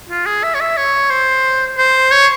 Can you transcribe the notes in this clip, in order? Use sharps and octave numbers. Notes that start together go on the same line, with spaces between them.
F4
G#4
E5
C#5
E5
C#5
C5
C5
C#5